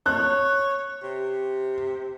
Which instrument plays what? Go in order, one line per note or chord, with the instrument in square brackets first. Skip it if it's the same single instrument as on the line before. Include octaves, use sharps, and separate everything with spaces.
[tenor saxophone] C#5 [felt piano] F#6
[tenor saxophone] C3